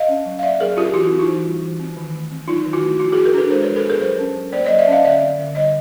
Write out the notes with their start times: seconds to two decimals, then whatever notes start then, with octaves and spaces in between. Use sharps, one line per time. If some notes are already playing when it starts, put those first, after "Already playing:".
Already playing: D#5 F5
0.08 C#4
0.25 F#3
0.39 F5
0.42 A#3 D5 E5
0.60 F#3 G#4 A#4
0.77 C#4 F4 G4
0.94 E3 E4 F#4
1.11 C4
1.20 D#4 F4
1.28 E3
1.45 G3
1.62 E3
1.80 C4
1.97 D#3
2.13 A3
2.31 C4
2.48 F#3 D#4 F4
2.66 D#3
2.73 E4 F#4
2.82 A3
2.99 F3 E4 F#4
3.12 F#4 G#4
3.16 B3
3.25 G#4 A#4
3.34 D4 A4 B4
3.50 G#3 A#4 C5
3.63 F3 B4 C#5
3.76 A4 B4
3.85 B3 G#4 A#4
4.01 F#3 A#4 C5
4.19 C#4
4.36 F#3
4.53 A#3 C5 D5
4.66 F#3 C#5 D#5
4.79 D5 E5
4.87 C#4 D#5 F5
5.04 D3 D5 E5
5.22 C4
5.39 D3
5.55 G3 C#5 D#5